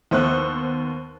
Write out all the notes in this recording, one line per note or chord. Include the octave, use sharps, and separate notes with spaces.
D#2 B3 C5 C#6 E6 F#6